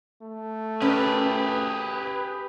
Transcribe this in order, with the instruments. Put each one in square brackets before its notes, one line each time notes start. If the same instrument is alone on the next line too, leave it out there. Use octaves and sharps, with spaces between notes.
[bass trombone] A3
[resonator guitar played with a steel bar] C#4 A#4 [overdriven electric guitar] G4 G#4 [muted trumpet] B4
[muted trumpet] B4